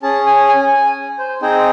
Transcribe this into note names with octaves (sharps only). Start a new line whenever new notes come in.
C#4 G#4 A5
G#5
G#5
G#5
C5
C4 D#4 G#4 C5